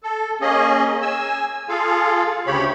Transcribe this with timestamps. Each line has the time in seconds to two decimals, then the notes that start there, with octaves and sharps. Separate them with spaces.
0.03 A4
0.41 A#3 C#4 G#4 D#5
1.02 G#5 E6
1.69 F4 G#4 A4 F5
2.47 D2 C#3 G4 C#5 B5